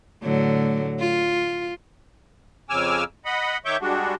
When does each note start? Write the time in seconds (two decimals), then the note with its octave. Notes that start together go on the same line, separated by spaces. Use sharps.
0.23 A2 D3 F#3
0.99 F4
2.70 F2 C#3 G#5 D6 E6 F6
3.25 D#5 F#5 B5
3.65 D#3 C#5 E5 C#6 D6 G6
3.81 G3 G#3 D4 F#4